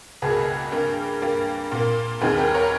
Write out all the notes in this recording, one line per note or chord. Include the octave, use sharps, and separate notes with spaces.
C#2 B2 G3 A#3 G#4 B4
G2 G3 A#3
G2 G3 A#3
A#2 A#3
D#2 D#3 G3 G#4 B4
G4 A#4
A#4 C#5